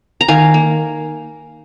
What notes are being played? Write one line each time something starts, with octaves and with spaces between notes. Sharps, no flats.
A#5
D#3 F5 G#5
A#3